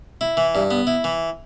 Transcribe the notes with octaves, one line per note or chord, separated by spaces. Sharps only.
E4
E3
G2
B3
E4
E3